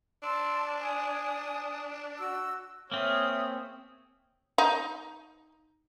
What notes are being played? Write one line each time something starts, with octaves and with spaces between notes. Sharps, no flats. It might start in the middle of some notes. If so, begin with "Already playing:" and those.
D4 A5 C6 E6
G#5 D#6
F#4 E6
A#3 C4 G#4 C#5 E5 D#6 F6
D#4